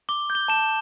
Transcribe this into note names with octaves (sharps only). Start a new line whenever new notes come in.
D6 G7
G6
G7
A5 E7